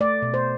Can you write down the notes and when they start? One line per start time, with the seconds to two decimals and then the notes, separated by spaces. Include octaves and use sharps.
0.01 A3 D5
0.22 B2
0.34 C5